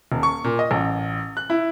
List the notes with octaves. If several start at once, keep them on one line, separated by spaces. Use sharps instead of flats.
D#1
C#6
A#2
D#5
A1
F#6
E4